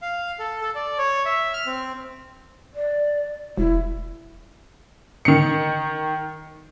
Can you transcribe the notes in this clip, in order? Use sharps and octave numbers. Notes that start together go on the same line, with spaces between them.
F5
A4
A4
D5
C#5
E5
F6
C4
D5
E1 E4
D#3 C#7